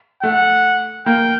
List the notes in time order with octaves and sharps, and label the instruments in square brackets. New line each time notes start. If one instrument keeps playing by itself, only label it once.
[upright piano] A3 [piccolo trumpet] F#5
[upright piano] A#3 [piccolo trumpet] G5